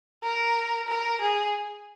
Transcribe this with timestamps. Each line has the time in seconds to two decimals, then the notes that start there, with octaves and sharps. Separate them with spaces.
0.23 A#4
0.88 A#4
1.21 G#4